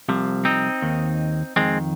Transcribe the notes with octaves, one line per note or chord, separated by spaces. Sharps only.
C2 C3 F3
C4 D#4
D#2 D#3
F2 D#3 G#3 C4